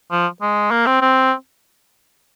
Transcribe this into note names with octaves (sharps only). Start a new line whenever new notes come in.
F3
G#3
A#3
C4
C4